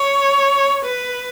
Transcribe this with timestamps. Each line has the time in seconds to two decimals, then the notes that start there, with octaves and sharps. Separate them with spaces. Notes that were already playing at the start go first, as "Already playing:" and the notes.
Already playing: C#5
0.85 B4